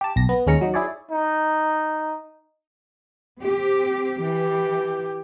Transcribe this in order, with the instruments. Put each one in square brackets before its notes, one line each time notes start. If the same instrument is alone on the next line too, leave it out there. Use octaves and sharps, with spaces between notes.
[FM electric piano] G4 A5
B1 A#6
B3
D#2 G#3 C#4 A#5 C#7
F#3 D#4
E4 G#4 C#5 D5
[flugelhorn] D#4
[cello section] C4 G4
[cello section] E3 [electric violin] G4